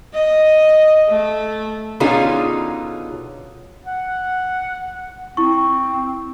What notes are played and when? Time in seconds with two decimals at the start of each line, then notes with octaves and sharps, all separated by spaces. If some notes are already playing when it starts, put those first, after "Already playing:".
0.14 D#5
1.08 A3
2.00 B2 D3 C#4 D#4 F4 G#4
3.85 F#5
5.37 C4 E4 C#6